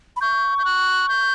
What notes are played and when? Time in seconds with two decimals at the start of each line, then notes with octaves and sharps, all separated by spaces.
0.16 B5
0.21 C#6 G6
0.58 G6
0.65 F#6
1.09 G6